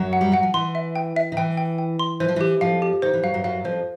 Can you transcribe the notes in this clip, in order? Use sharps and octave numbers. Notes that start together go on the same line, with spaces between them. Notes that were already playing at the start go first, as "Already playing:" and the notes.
Already playing: F#2 F#3
F#5
G3
F#3 F#5
F3
E3 C6
E5
G5
E5
D#3
E3 G5
G5
G5
C6
E3 C5
F3
E3 G4
F2 F3 F5
G4
D#3 C5
E3
F#2 F#3 F5
F#2 F#3
F#2 F#3 F5
F2 F3 C5